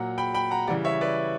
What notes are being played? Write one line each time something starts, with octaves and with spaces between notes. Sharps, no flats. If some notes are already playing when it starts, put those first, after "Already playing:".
Already playing: A#2 F#3 F#5 A#5
G5 B5
G5 B5
F#5 A#5
C#3 E3 G3 D5 F#5
C#5 E5
B4 D5